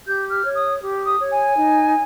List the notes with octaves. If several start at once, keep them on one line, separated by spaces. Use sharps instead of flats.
G4 G6
F6
C#5
D#6
G4
D#6
C#5
G#5
D#4